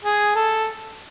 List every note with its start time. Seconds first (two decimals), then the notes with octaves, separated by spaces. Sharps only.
0.04 G#4
0.35 A4